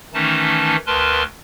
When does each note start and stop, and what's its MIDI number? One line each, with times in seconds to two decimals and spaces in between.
0.14 0.76 51
0.14 0.76 52
0.14 0.76 57
0.14 0.76 61
0.14 0.76 63
0.14 0.76 81
0.87 1.23 38
0.87 1.23 70
0.87 1.23 71
0.87 1.23 81
0.87 1.23 84